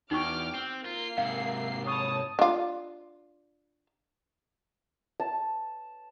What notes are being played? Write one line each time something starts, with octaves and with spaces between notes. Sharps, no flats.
E2 D#4 F#4 G5 C#6 D6 F6
C4
A#3 F4 C7
G#2 C3 F5
C#5 A5 B5 C#6 D#6
D4 F4
A5